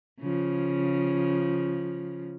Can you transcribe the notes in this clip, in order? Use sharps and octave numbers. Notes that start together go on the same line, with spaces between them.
C#3 F3